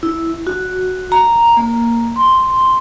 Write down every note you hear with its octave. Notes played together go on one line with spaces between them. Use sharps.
E4
F#4
A#5
A#3
C6